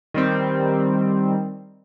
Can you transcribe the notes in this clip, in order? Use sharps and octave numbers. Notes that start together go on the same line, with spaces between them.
D#3 G3 C4